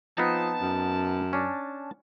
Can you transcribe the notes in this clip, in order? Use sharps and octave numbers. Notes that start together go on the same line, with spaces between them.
F3 B3 C4 D#4 A5
F#2
C#4 D4